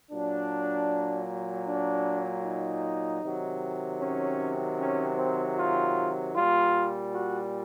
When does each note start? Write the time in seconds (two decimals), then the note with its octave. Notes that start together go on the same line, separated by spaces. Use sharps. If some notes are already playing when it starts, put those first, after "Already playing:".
0.11 A#2 F#3 D4
1.68 D4
2.45 D#4
3.23 C3 D#3 F#3
4.01 C#4
4.79 C#4
5.18 C4
5.59 F4
6.36 A#2 G3 F4
7.14 F#4